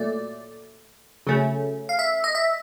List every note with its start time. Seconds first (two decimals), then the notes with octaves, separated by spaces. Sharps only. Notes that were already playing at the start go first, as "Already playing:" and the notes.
Already playing: A#2 F#3 A3 D5
1.27 C#3 F#3 A3 C#4
1.89 F5
1.99 E5
2.24 D#5
2.35 E5